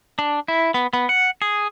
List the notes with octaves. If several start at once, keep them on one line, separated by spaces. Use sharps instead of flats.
D4
E4
B3
B3
F#5
G#4